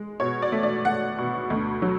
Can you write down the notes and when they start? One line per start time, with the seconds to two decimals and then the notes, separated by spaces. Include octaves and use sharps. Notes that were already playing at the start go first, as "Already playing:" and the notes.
Already playing: G#3
0.20 B2 C#5
0.42 D5
0.52 A3
0.63 D5
0.85 A3 F#5
1.18 B2
1.50 D2
1.82 F#3